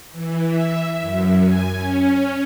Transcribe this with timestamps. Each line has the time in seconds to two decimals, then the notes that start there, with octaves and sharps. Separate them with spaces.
0.12 E3
0.49 E5
1.01 F#2
1.41 G#5
1.75 C#4